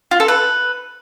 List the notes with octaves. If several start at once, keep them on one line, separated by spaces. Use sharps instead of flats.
F4
A4
B4